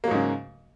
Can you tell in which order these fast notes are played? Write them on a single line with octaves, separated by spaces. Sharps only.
A#3 F#3 G#2 C#3